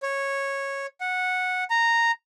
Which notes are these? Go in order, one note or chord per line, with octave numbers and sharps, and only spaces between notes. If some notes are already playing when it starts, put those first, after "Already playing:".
C#5
F#5
A#5